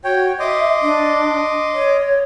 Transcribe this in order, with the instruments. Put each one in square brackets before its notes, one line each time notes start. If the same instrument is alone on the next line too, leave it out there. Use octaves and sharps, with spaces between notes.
[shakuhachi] F#4 [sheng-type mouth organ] C#5 G5
[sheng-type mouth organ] D#5 C6 D6 [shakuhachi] E5
[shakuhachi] D4
C#5